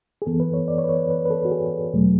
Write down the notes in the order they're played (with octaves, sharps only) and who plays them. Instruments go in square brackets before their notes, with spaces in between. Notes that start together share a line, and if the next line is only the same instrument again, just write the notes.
[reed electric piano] G#4
F#2 E3 B3 A4
B4
C#5
D5
C#5
B4
C#5
B4
B4
B4
A4
F#4
G#4
E2 B2 F#3 A3